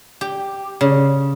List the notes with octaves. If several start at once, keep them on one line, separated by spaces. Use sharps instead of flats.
G4
C#3